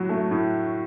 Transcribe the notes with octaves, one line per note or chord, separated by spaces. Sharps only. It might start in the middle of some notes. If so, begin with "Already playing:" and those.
Already playing: A2 F#3 F#4
A3
A2